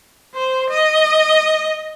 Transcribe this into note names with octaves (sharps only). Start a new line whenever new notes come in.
C5
D#5